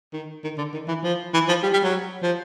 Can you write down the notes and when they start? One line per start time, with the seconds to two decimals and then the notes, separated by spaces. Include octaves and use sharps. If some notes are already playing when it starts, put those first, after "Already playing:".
0.13 D#3
0.44 D#3
0.58 D3
0.73 D#3
0.88 E3
1.04 F3
1.34 E3
1.48 F3
1.63 G3
1.73 G3
1.83 F#3
2.23 F3